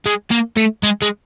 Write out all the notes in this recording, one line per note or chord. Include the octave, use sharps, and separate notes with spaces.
G#3
A#3
A3
G#3
G#3